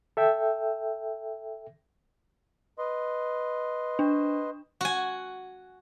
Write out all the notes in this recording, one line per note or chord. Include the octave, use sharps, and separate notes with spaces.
A4 E5 G5
B4 D#5 C6
D4
F#4 G#5